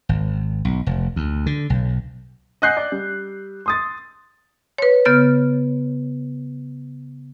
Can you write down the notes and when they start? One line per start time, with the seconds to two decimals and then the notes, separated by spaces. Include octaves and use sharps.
0.09 G#1
0.65 B1
0.87 F1
1.16 D2
1.46 D3
1.70 B1
2.62 D#5 F#5 G#5 F#6 G6 C7
2.77 D5
2.92 G3
3.66 C6 D#6 A6
4.78 B4 C#5
5.05 C#3 B3 F6 G6 A6